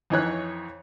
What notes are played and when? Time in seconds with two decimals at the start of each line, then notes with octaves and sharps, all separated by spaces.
0.10 F2 E3 D#4 C#5 F#6